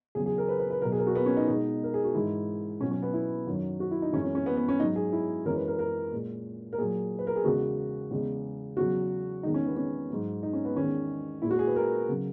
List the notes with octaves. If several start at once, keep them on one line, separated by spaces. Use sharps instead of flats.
E2 C#3 F#3 G#4
G#4
A#4
B4
B4
B4
B2 F#3 A#4
G#4
A#4
F#4
B3
C#4
D#4
B2 G#3 D#4
A#4
G#4
F#4
G#2 E3 G#3 E4
B2 F#3 C#4
C#4
B3
E4
F#2 D#3 F#3
F#4
E4
D#4
F#2 E3 G#3 C#4
C#4
C#4
B3
B3
C#4
G#2 F#3 D#4
G#4
E4
F#2 E3 G#3 A#4
B4
A#4
A#4
A#2 G#3
A#4
A#2 F#3 G#4
B4
A#4
G#4
E2 C#3 G#3 F#4
E2 C#3 G#3
E2 C#3 F#3 F#4
E2 D#3 G#3 D#4
C#4
B3
C#4
G#2 F#3
D#4
C#4
B3
E2 D#3 G#3 C#4
A#2 G#3 E4
F#4
G#4
B4
A#4
C#3 F#3